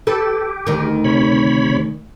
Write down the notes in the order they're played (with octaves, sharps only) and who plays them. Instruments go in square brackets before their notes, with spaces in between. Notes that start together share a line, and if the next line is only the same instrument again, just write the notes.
[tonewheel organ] G4 [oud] A4 B4
[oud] D2 D#3
[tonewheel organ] C3 C#5 B5